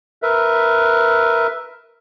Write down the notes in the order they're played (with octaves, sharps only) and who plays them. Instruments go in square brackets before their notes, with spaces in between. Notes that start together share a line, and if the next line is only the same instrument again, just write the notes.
[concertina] A#4 B4 E5